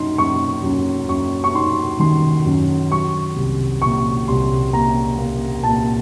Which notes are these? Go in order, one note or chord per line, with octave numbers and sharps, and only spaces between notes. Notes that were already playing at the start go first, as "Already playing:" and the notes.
Already playing: F#2 D#4 C6
F#2 C#6
F#2
F#2 C#6
C#6
D#4 C6
D#3 C6
F#2
F#3 C#6
C2
A#2 C#6
C2 C6
A#3 A#5
A#3
A#2 A5